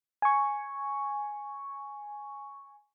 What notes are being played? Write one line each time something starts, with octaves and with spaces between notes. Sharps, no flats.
G#5 C#6